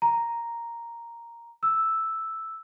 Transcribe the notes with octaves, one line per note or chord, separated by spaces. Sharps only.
A#5
E6